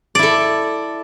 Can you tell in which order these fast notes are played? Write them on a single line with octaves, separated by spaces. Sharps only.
D5 E4 A4